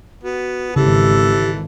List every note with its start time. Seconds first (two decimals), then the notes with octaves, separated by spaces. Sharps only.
0.24 B3 F#4
0.76 G#1 C#3 E3 G4 A4